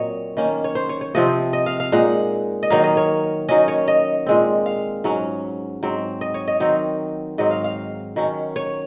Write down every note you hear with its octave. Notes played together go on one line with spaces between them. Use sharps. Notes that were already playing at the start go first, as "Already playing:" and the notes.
Already playing: A#2 F#3 C4 C#5 D#5
D#3 A#3 C#4
C#5
C5
C#5
C#5
C3 F3 C4 D#5
D#5
F5
F5
A#2 G#3 D#4 F#5
D#5
D#3 F#3 A#3 F5
D#5
C#5
D#3 F#3 C#4 D#5
C#5
D#5
A#2 G#3 C4
F5
G#2 F#3 C#4
G#2 F#3 C4
D#5
C#5
D#5
D#3 F#3 C4 D#4
G#2 F#3 C4 D#5
F5
F5
D#3 F#3 C#4
C#5